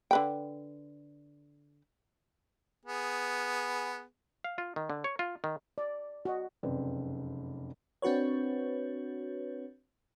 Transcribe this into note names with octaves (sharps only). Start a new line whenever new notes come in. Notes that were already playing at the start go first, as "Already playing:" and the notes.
D3 B4 G5
B3 G#4
F5
F4
D#3
D3
C#5
F4
D#3
D5
F#4 D#5
F1 F#2 C#3 C4 B4 D5
C4 D4 F#4 B4 C#5